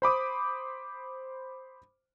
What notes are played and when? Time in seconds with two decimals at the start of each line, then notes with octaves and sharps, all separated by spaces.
0.02 C5 B5 D6 D#6